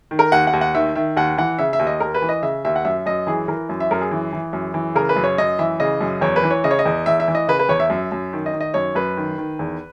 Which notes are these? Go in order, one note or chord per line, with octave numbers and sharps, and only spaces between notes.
D#3
A#4
D#2 F#5
F#5
D#2
F#5
D#3 E5
D#3 E5
D#2 F#5
E3 F#5
C#3 E5
E5
D#2
D#5
D#2 A#4
B4
E3
D#5
C#3 E5
D#2 E5
F#5
F#2 E5
F#2 D#5
E3 G#4
E3 A#4
F#2
E5
F#2 A#4
G#4
E3
E3
F#2
E3
C#3 A#4
B4
F#2
C#5
F#2 D#5
E3 E5
C#3 D#5
F#2
E2 C#5
B4
E3
C#5
C#3 D#5
C#5
D#5
E2
E2 E5
E5
E3
D#5
C#3 B4
B4
E2 C#5
E5
F#2
F#2
D#3
D#5
D#3
D#5
F#2 C#5
F#2 B4
D#3
D#3
E2